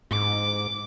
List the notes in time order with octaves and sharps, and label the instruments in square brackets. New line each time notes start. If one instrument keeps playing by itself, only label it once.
[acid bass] G#2 [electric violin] D6